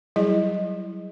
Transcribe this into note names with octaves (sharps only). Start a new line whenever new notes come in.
F#3 G3 E4 G#4 D#5